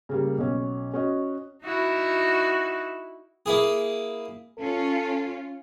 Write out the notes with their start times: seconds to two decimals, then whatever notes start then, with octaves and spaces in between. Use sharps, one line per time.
0.09 C#3 G3 A#3
0.38 B1 C#4
0.94 C#4 F#4 D#5
1.65 D#4 E4 F#4
3.46 A#3 E4 G#4
4.58 C#4 F4 A4